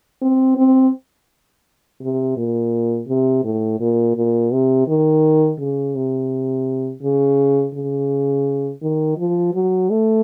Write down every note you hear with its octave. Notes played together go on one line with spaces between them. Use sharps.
C4
C4
C3
A#2
C3
A2
A#2
A#2
C3
D#3
C#3
C3
C#3
C#3
D#3
F3
F#3
A3